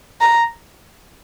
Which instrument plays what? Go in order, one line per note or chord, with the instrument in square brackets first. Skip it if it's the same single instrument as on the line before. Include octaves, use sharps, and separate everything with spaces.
[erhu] A#5